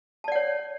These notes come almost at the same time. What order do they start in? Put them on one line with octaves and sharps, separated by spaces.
A5 D5 F#5 C#5